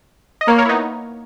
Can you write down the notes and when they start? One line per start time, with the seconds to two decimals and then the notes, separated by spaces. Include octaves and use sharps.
0.41 D#5
0.47 A#3 A#4 C#5
0.58 A#4 C#5
0.65 E4
0.69 B3 D#4